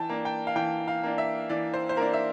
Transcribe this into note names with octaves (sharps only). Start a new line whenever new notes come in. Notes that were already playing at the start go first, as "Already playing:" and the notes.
Already playing: E3 G5 A5
A#3 D4
G5
F5
E3 G5
F5
A#3 D4
E5
E3 D5
C5
C5
A#3 D4 A#4
E5